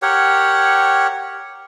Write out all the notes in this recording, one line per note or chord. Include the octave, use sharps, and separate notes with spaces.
G4 A#4 C#5 F#5